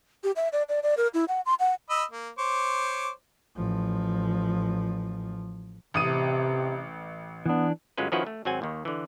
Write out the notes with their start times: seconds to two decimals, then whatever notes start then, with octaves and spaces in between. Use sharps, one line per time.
0.24 G4
0.36 E5
0.53 D5
0.69 D5
0.83 D5
0.97 A#4
1.14 E4
1.28 F#5
1.46 C6
1.60 F#5
1.90 D#5 B5 E6
2.11 A#3
2.38 C5 C#5 D6
3.56 A1 F3
5.94 A1 C3 D#6 D#7
7.46 E3 B3 D4
7.97 G1 F#3 G#3 C#4 F4 B4
8.12 D#3 F3 C#4 E4 F#4 B4
8.26 A3
8.45 G#1 F#3 C4 F#5 G#5
8.62 D#2 D#3
8.85 D3 E3